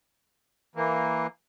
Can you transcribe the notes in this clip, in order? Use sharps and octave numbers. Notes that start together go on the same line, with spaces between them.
E3 A#3